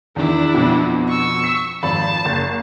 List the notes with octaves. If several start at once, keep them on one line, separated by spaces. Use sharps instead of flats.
E2 D#3 D4 E4
F2 B2
C#6 E6
B6
G#1 F2 A5 B5
F#1